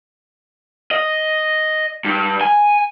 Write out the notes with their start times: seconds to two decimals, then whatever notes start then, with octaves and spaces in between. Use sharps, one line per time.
0.91 D#5
2.04 G2
2.41 G#5